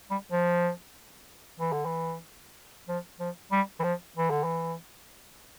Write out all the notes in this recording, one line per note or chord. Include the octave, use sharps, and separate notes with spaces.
G3
F3
E3
D3
E3
F3
F3
G3
E3
F3
E3
D3
E3